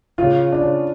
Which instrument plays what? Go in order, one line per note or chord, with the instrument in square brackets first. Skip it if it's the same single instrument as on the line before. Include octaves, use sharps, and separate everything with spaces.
[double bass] C#3 [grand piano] F4
[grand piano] D4